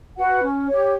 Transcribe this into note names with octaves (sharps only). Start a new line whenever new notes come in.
F#4 B4 F#5
C#4
G4 C#5